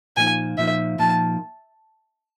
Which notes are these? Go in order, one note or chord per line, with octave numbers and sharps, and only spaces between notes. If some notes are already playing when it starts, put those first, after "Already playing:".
A#2 F3 A#3 D#4 G#5
A#2 F3 A#3 D#4 E5
A#2 F3 A#3 D#4 A5